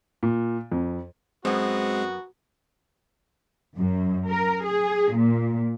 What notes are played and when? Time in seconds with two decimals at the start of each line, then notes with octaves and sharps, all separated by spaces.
0.23 A#2
0.72 F2
1.45 F#2 G#3 B3 C4 F#4
3.76 F#2
4.27 A#4
4.64 G#4
5.14 A#2